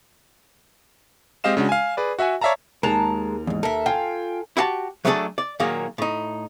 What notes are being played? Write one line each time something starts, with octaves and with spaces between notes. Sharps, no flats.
G#3 C4 G4 D#5 F5 E7
C#3 G#3 D4 F#4
F5 G#5
G#4 B4 D5
F#4 E5 F#5 G#5
C#5 D5 E5 F5 A5 A#5
D#2 G#3 A#4 A5 A#5 F7
E2 G#2
A4 A#4 E5
F4 G5 G#5
E4 F#4 G4 A5
F#3 A3 B3 D4 G#4 A4
D5
A#2 D#3 F#3 A#3 G#4
A2 D#4